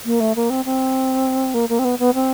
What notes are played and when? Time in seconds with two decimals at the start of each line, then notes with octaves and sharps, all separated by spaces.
0.05 A#3
0.20 A3
0.36 A#3
0.50 C4
0.65 C4
1.54 A#3
1.69 A#3
1.79 C4
1.85 B3
1.99 B3
2.14 C4